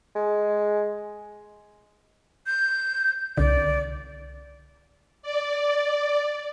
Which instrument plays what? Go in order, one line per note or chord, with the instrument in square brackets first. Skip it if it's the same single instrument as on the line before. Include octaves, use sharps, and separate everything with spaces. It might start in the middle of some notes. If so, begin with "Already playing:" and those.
[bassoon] G#3
[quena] G6
[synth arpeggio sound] C2 D3 [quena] D5
[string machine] D5